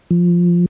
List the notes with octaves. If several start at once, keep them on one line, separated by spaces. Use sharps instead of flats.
F3